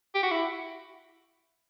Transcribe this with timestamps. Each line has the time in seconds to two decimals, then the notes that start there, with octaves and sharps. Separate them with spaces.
0.15 G4
0.23 F#4
0.31 E4